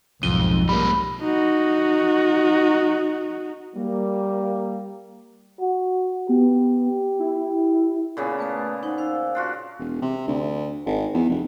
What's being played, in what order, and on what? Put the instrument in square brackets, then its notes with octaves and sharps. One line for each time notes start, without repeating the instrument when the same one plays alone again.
[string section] B1 G#2 [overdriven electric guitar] F2 [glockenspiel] D#7 G7
[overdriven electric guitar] G3 A#3 [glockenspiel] B5
[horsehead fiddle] D#4 F#4
[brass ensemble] G3 A#3
[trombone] F#4
[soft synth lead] B3 [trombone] G4
[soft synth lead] E4
[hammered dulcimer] A#2 C#3 B3
[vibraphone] A3 B4 D#6
D#4 C5 F#5
C5 F5 E6
[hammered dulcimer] D4 F4 F#4
[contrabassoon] E1
C3
D2
G#1
E2
F1